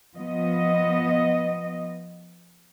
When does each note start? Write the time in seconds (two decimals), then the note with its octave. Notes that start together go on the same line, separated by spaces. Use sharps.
0.16 F3 B3 D#5